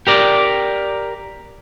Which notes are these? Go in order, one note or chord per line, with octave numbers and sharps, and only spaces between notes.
G4 A#4 D5